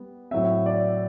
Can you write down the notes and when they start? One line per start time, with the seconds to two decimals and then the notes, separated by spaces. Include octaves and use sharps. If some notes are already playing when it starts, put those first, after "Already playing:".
Already playing: G3 B3
0.31 A2 F#3 C4 E5
0.66 D5